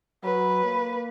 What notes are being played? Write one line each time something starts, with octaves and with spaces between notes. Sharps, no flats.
F#3 B4
A#3